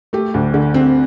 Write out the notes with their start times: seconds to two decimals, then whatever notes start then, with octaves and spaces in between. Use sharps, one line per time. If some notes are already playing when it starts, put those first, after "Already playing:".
0.13 A3 G4
0.34 D2
0.54 D3
0.74 C4